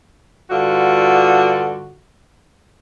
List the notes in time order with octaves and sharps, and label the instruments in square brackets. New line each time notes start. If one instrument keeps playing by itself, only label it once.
[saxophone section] G2 D3 F4 F#4